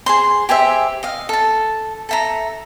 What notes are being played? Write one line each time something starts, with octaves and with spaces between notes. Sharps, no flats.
G#4 C5 C6
G4 G#4 C5 E5
D#5 F5
A4 A5
A4 E5 A#5